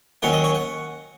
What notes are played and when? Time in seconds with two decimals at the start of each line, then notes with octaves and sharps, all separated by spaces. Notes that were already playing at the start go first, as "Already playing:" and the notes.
0.22 D#2 D#3 F#3 C#4 F#5
0.33 D#5
0.44 C#5
0.55 F#5